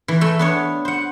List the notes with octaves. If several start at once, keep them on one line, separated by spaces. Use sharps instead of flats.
E3
A3
B3 D4 C#5
C5 F#5